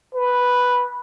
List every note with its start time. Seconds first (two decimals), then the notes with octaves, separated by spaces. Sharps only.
0.15 B4